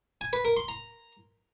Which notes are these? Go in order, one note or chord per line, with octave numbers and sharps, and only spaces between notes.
G#5
B4
A#4
C6
A#5